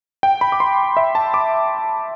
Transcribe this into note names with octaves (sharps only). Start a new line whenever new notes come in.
G5
B5
D6
C6
E5
A5
D6